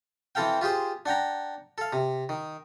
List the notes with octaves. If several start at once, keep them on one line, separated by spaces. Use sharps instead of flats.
E3 C4 A4 F5 G5
F4 G4 G#4 C5
D4 F#5 G5 A#5
A4 F5
C3
D#3